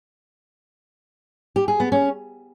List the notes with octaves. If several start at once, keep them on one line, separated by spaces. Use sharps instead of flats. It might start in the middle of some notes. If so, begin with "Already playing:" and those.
G4
G#4
B3
C#4